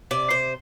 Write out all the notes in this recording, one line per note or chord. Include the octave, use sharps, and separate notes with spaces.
C3 D5
C5